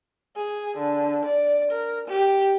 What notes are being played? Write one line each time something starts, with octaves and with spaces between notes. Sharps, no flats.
G#4
D3
D5
A#4
G4